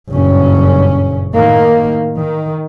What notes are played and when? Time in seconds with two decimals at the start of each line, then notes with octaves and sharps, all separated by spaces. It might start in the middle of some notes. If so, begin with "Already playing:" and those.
0.12 F#1 G2 A#2 C#4
1.34 A2 D#3 A#3
2.18 D#3